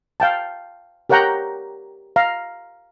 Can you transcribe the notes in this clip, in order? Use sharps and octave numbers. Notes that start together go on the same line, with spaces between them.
F5 G5 A5
G4 A#4 C#5 F#5 G5 A#5
F5 A#5